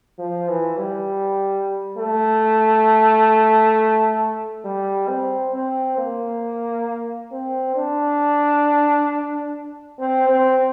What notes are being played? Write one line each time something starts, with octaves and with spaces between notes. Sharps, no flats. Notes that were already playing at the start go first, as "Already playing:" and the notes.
F3
E3
G3
A3
G3
C4
C4
A#3
C4
D4
C4
C4